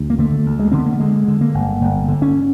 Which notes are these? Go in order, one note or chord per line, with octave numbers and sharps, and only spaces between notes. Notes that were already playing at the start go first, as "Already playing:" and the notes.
Already playing: D2
A#3
D3 A3
D2
G#3
D3 C4
B3
A#3
A3
D3 G#3
D3
A#3
G1
G1
D3
C#4